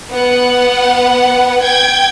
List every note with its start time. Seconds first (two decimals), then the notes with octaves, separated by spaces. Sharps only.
0.10 B3 F#5
1.62 G5 G#6